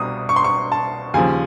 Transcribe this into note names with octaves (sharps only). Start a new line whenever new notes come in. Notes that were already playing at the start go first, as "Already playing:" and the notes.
Already playing: C2 B2 G3 D#6
C#6
C6
C#6
A5
D#2 C#3 F3 G#5